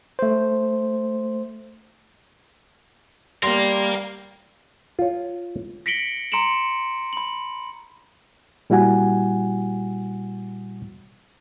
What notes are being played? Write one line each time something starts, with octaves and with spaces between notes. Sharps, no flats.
A3 C5
G3 A#3 A#4 F5 C6
F4 C#5
A#6 B6 C#7 D7 F#7 G7
A#5 C6 C#7 D7 E7 F#7
B5 F#7
A#2 G3 E4 F#4 F#5 G#5